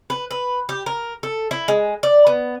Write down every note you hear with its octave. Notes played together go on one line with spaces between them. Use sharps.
B4
B4
G4
A#4
A4
E4
G#3
D5
B3